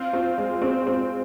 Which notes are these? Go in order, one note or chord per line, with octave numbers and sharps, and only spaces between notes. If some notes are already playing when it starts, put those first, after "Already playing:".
Already playing: C4 F4
C4
G#3
C4
C4